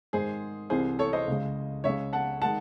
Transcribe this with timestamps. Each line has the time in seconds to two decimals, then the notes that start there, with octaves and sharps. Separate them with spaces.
0.13 G#2 D#3 G#3 G#4 C5
0.70 C2 C3 E3 G#4 C5
0.99 A4 C#5
1.13 C5 D#5
1.27 C#2 C#3 G#3
1.84 C#2 C#3 G#3 C#5 E5
2.13 F#5 A5
2.41 D#3 G#3 F#5 A5